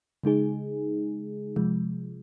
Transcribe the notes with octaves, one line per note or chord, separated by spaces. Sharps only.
C#3 G#3 D#4 G#4
C3 F3 G#3